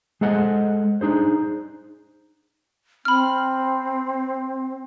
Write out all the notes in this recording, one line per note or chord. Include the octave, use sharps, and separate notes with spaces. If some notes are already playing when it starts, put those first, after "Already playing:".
G#3 G#4 A4 C5 D#5 F#5
D4 D#4 G#4 C5
C4 B5 F6